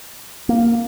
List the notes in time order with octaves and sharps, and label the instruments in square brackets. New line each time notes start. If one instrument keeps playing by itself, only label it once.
[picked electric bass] A#3